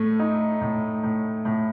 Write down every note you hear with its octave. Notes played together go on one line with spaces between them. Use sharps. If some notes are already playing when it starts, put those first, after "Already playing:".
Already playing: A2 A3
D#4
A2
A2
A2